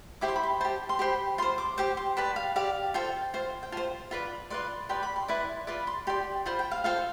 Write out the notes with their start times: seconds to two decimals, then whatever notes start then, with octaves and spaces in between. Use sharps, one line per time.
0.21 E4 G4 C5 D6
0.28 C6
0.36 B5
0.43 C6
0.61 G4 C5 A5
0.89 C6
0.99 G4 C5 B5
1.38 F4 C5 C6
1.58 D6
1.78 G4 C5 D6
1.97 C6
2.17 G4 B4 D5 A5
2.36 F5
2.56 G4 D5 F5
2.94 F4 A4 C5 G5
3.34 F4 C5
3.63 G5
3.72 F4 C5 A5
4.11 F4 B4 D5
4.50 F4 B4 D5 C6
4.89 G4 B4 D5 C6
5.03 B5
5.16 C6
5.28 E4 B4 D5
5.67 F4 B4 D5 B5
5.87 C6
6.07 G4 D5 C6
6.46 F4 C5 B5
6.59 G5
6.71 F5
6.84 F4 A4 C5 F5